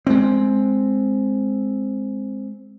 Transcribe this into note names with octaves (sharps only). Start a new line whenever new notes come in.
G#3 C4